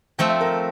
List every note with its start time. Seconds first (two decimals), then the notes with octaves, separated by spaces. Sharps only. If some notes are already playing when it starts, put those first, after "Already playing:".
0.19 F3 A3 C4 G5
0.30 E5
0.41 A#4